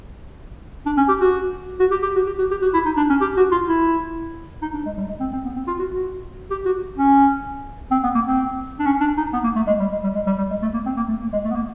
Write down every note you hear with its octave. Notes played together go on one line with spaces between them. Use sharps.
D4
C#4
G4
F#4
F#4
G4
G4
F#4
G4
F#4
G4
F#4
E4
D#4
D4
C#4
G4
F#4
F4
E4
D#4
D4
G#3
G3
G#3
C4
C4
B3
C4
F4
F#4
F#4
G4
F#4
C#4
C4
B3
A#3
C4
D4
C#4
D4
D#4
B3
A#3
A3
G#3
G3
G#3
G3
G#3
G3
G3
G#3
A3
A#3
C4
A#3
A3
A#3
G#3
A3
B3
A#3